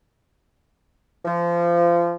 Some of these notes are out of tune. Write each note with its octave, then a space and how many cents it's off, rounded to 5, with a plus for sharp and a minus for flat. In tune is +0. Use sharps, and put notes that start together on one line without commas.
F3 -25